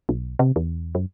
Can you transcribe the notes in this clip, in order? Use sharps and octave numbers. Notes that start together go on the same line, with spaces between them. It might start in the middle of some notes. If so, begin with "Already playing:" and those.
B1
C3
E2
F#2